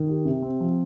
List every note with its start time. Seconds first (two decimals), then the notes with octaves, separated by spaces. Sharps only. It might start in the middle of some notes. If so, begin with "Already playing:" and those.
Already playing: D#3
0.08 G4
0.25 C3
0.42 C4
0.60 F3